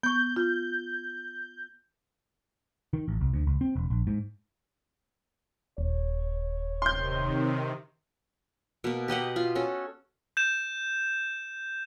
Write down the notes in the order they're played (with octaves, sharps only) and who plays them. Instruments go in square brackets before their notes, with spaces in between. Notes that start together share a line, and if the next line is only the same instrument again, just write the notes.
[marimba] B3 C#6 [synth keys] G6
[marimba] F4
[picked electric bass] D#3
A1
C2
D2
C#2
C4
E1
A#1
G#2
[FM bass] D#1 [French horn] C#5
[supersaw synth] C3 D#3 [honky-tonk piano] C6 G6
[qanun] B2 A#3
G4 B4 D#5 F#5
F4
C#4 F#4 A4
[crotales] G6 E7